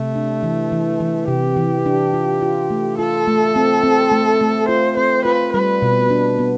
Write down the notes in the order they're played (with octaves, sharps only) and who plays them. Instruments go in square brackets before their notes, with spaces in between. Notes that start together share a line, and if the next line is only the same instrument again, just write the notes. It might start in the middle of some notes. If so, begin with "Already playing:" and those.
Already playing: [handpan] C3 [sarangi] A3
[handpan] D4
E3
E3
E3
[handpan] C3 [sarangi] G4
[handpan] E3
D4
F4
F4
A3
[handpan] F4 [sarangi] A4
[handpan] A3
C4
C4
A3
A3
[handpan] F4 [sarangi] C5
[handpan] C4 [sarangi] C5
[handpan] F4 [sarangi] B4
[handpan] G3 [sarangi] B4
[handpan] B2
D4
B3